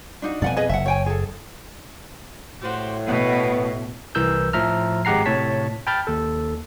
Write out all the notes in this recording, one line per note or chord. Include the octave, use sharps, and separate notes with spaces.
D4 D#4 F#4
F2 B2 D5 F#5 G#5
G#4 B4 D#5
F#1 E5 F#5
C#5 G5 G#5
G#4 A4
A2 F#4 G4 C5
B2 B3
C2 E3 A#4 E6 G6
A2 F3 E5 A#5 F6
G#1 G#3 G4 F#5 A#5 C7
A2 C3 C#5 A5 B6
G5 A5 B5 F6 G6 A6
D#2 A4